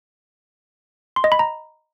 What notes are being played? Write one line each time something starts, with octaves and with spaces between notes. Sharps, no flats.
C6
D#5
B5
A#5